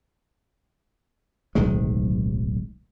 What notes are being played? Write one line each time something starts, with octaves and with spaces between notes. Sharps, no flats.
D1 B1 D#3 G#3